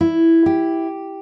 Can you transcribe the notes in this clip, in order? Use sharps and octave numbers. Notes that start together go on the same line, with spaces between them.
E4
G4